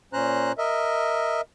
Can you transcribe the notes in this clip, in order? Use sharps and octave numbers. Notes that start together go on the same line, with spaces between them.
A#2 C#4 C5 A#5 F#6
A#4 D#5 E5